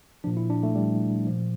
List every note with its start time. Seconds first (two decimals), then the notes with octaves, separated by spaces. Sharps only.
0.24 A#2 F3 D4
0.37 E4
0.50 D4
0.63 A3
0.75 G3
1.27 A#2 F3